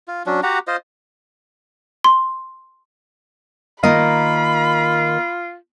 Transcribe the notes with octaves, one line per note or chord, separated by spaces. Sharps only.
F4
F#3 C#4 D4
F#4 G4 F#5 A#5
F4 C5 D#5
C6
D#3 A#3 F4 D#5 B5